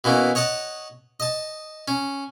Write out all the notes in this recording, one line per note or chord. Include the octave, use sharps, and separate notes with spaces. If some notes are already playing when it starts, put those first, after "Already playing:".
B2 E3 A#3 C#4
C#5 D#5 F#5 A5
D#5 A5
C#4